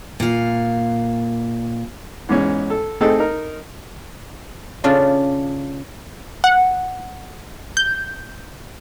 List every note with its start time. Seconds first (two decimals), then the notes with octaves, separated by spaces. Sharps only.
0.20 A#2 F5
2.29 E2 G#2 C#4
2.70 A4
3.01 A3 C4 D#4 G#4 A4
3.18 D#4 A#4
4.84 C#3 C#4 D4 F4
6.44 F#5
7.77 G6